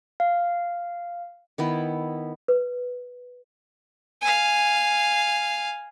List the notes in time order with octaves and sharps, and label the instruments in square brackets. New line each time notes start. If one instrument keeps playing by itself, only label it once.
[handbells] F5
[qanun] D#3 B3 E4
[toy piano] B4
[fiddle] F5 G#5